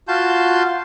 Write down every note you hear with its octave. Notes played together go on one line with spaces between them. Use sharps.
F4 F#4 A5 C6 G6